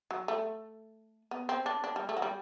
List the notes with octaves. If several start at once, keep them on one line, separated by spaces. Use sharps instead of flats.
F#3
A3
B3
C4
D4
D4
G3
A3
F#3
G3